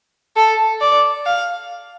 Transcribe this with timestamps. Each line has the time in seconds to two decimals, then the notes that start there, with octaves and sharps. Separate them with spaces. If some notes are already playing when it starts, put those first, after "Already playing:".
0.36 A4
0.81 D5
1.26 F5